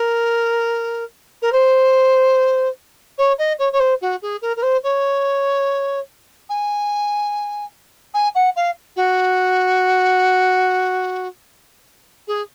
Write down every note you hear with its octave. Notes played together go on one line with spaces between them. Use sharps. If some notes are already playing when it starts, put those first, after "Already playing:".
Already playing: A#4
A#4
C5
C#5
D#5
C#5
C#5
C5
F#4
G#4
A#4
A#4
C5
C#5
G#5
G#5
F#5
F5
F#4
G#4